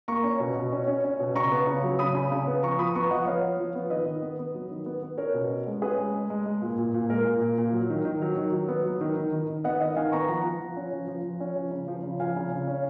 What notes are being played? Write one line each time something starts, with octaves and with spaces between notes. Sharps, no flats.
A#3 A#5 C#6
C#4
B2
B2
C#4
C#4
C#4
B2
C#3 A#5 C#6
B3
C#3
F#3
C#3 B5 D#6
C#3
C#3
B3
F3 A#5 C#6
F3 B5 D#6
B3 A#5 C#6
F3 D#5 F#5
B3 C#5 F5
F3
F3
B3
D#3 B4 D#5
D#3
B3
B3
F#3
D#3
B3
B3
C#4 A#4 C#5
B2
C#4
G#3
C#4 G#4 B4
G#3
G#3
G#3
G#3
A#2
A#2
A#2
G#3 A#4
A#2
A#2
A#2
F#3
D#3
D#3
F#3
D#3
F#3
B3
F#3
D#3
D#3
D#3
D#3
B3 D#5 F#5
D#3 D#5 F#5
D#3 F5 G#5
B3 A#5 C#6
F3 F#5 A#5
F3
F3
C#4
F3
F3
F3
C#4
F3
C#3
F3
C#3
F3 F5 G#5
C#3
C#3
C#4